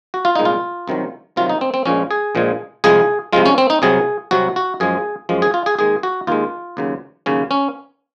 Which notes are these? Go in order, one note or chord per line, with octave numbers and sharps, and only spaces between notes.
F#4
F4
C2 A#2 G#3 D#4
F4
C2 C3 D#3 F#3
C2 C3 D#3 F#3 F4
D#4
C4
C4
A#1 A#2 F3 G#3 C#4
G#4
A#1 A#2 F3 G#3
C2 C3 F3 G#3 G#4
C2 C3 F3 G#3 F4
C#4
C4
D#4
C2 C3 F#3 G#4
C2 C3 F#3 F#4
F#4
F#2 F3 G#3 G#4
F#2 F3 G#3
G#4
F4
G#4
D#2 D#3 G#3 G#4
F#4
D#2 D#3 G#3 F4
D#2 C#3 F#3
D#2 C#3 F#3 C#4
C#4